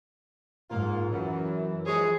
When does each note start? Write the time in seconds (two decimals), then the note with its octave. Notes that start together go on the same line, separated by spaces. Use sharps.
0.70 G#2 A#3 F4
1.13 F#2 E3
1.86 F3 G#3 G#4 C#5